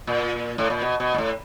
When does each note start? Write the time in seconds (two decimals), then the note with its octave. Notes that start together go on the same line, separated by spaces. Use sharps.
0.07 A#2
0.58 A2
0.70 A#2
0.82 B2
1.00 B2
1.14 A#2
1.18 A2